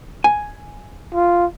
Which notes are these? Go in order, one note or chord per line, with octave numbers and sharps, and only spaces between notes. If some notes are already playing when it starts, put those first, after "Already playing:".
G#5
F4